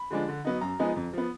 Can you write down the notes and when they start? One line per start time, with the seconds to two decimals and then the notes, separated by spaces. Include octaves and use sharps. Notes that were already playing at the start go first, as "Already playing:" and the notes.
Already playing: B5
0.10 D3 F3 G#3 D4
0.28 D3
0.45 F#3 B3 D#4
0.61 F#2 A#5
0.79 F3 G#3 B3 D#4
0.96 F2
1.13 F3 B3